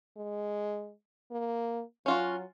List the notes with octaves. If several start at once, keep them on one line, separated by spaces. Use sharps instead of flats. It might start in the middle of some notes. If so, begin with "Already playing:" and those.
G#3
A#3
F#3 C#4 F4 F#4